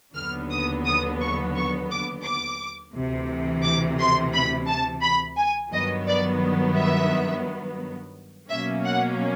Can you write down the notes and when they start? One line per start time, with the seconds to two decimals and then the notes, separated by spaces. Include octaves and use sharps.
0.16 D#2 D3 F#3 B3 F6
0.51 D#6
0.86 D#6
1.21 C#6
1.56 C#6
1.90 D6
2.25 D6
2.95 D2 C3 E3
3.63 D6
3.99 C6
4.34 B5
4.68 A5
5.03 B5
5.37 G#5
5.73 G2 D#3 F#3 B3 D#5
6.07 D5
6.77 E5
8.50 B2 F#3 A#3 C#4 E5
8.85 F#5